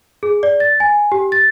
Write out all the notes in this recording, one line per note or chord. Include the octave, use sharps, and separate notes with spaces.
G#4
D5
A6
G#5
G4
A6